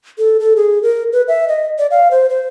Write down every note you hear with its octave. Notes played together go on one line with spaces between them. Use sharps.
A4
A4
G#4
A#4
B4
E5
D#5
D5
F5
C5
C5